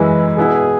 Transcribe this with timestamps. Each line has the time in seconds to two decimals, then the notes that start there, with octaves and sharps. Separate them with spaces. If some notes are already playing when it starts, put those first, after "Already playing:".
Already playing: F#2 E3 G#3 E4 B4
0.37 B2 B3 E4 G#4